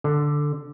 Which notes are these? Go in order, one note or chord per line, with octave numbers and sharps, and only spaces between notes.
D3